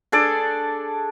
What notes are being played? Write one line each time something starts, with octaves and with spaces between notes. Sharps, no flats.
D4 G#4 A4 D5